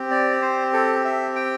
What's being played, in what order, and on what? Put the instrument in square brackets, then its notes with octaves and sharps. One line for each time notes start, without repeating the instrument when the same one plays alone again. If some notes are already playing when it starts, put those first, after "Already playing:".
Already playing: [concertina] C4 G4
D5
C5
A4
E5
G5